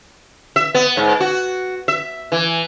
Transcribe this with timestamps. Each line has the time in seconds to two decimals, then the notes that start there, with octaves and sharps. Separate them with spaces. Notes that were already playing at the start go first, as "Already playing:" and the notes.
0.56 E5
0.74 B3
0.97 G#2
1.20 F#4
1.88 E5
2.32 E3